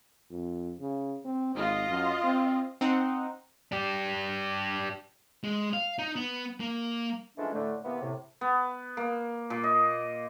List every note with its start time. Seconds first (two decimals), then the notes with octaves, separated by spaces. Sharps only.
0.31 F2
0.80 C#3
1.25 C4
1.55 G#1 F4 D#5
1.89 F#2
2.24 C4
2.81 C4 D#4 F#5
3.72 D4 G4
5.44 G#3
5.73 F5
5.99 D#4
6.16 B3
6.60 A#3
7.38 E3 F3 G#3 A3 C#4 D4
7.53 A2 D3 A3
7.85 C3 E3 A#3 B3
8.02 A2 C3
8.41 B3
8.97 A#3
9.50 A#2
9.64 D#5